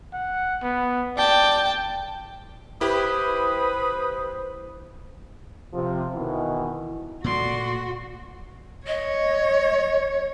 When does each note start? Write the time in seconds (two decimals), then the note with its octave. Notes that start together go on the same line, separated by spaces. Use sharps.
0.13 F#5
0.63 B3
1.17 D5 G5 A5
2.81 E4 G4 B4 C5 D#6
5.73 C3 F3
6.14 B2 D#3 E3
7.24 A#2 A3 F#4 D5 C6
8.87 C#5 D#5